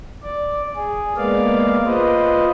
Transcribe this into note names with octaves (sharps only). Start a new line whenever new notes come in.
D5
G#4
G#3 A#3 B3 D5 F5
F4 B4 C5 D#5